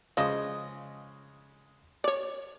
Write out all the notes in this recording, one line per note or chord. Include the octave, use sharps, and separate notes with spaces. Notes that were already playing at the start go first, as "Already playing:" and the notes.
C#3 F3 G#3 D#5
C#5 D5